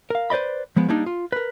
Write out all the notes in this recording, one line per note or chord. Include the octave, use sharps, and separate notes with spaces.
A#4 F5
B4 C5 D5 D#5 B5
F3 G#3 B3
G3 A#3 D4 D#4
F4
A#4 B4